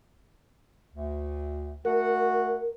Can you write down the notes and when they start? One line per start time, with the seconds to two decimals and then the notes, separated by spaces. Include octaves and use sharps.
0.94 D2
1.85 A3 F#4 A#4 F#5